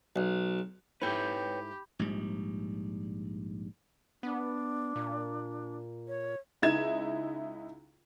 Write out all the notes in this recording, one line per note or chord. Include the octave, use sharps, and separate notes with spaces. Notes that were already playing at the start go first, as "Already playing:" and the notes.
B1
G#2 A3 E4 G4 B4 C#5 G5 B5
A#1 G#2 G3
B3 D4
A#2
C#5
C#2 D#4 E4 G#6 E7